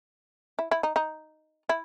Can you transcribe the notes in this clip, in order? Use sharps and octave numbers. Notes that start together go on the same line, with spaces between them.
E4
E4
D#4
D#4
E4